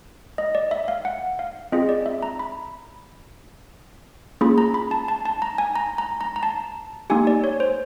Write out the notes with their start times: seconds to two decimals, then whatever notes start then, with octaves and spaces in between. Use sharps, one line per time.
0.38 D#5
0.55 D5
0.71 E5
0.88 F5
1.05 F#5
1.39 F5
1.72 C4 F4 G#4 D#5
1.89 D5
2.06 E5
2.23 A#5
2.39 B5
4.41 A#3 C#4 F4 G#4 B5
4.58 A#5
4.74 B5
4.91 A5
5.08 A5
5.25 A5
5.42 A#5
5.58 G#5
5.75 A#5
5.98 A#5
6.21 A#5
6.36 A#5
6.43 A5
7.10 A#3 D#4 G4 G#5
7.27 D5
7.44 C#5
7.60 C5